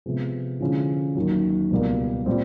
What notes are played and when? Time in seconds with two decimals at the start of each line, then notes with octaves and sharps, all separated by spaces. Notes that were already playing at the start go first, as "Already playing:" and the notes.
0.06 C3 F3 G#3 B3
0.60 D3 F3 G#3 C#4 E4
1.15 D#2 D#3 F#3
1.71 C#2 B2 G3 A#3
2.26 A#2 G3 C4